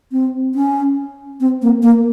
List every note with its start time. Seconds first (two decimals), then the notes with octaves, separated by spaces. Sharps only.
0.12 C4
0.55 C#4
1.40 C4
1.62 A#3
1.83 A#3